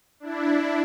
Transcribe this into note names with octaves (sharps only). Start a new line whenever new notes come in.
D4 E4